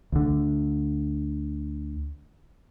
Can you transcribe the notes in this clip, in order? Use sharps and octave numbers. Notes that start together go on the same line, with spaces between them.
D2 D3